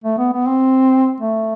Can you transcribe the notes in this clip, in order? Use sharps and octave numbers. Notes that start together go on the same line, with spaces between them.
A3
B3
B3
C4
A3